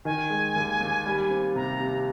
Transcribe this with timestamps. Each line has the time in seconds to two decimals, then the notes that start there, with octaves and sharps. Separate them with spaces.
0.05 D#3 G#5
0.30 G#3
0.56 D#2
0.81 D#2
1.06 G3
1.30 C4
1.56 C3 A#5
1.80 C3